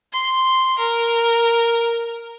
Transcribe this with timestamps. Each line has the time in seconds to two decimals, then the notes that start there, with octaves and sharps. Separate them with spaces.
0.12 C6
0.79 A#4